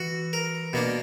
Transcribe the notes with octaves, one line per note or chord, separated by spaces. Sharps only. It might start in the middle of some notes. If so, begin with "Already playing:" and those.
Already playing: E3 F#4
A#4
B2 A#3 D4